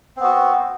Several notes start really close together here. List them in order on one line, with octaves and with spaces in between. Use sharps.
C4 B3 F#4